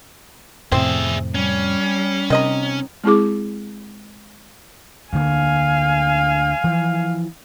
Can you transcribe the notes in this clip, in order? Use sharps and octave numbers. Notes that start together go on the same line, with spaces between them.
F2 A2 C3 C4 G#4 E5
G3 C#4
C3 D#3 D#5 A#5
G#3 C4 E4 G#4 D6
D2 D3 A#3 F5 G#5
E3 F3